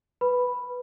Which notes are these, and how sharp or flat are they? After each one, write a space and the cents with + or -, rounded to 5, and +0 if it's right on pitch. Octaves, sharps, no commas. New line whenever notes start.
B4 +0 B5 +0